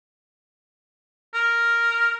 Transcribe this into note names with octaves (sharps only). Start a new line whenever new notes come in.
A#4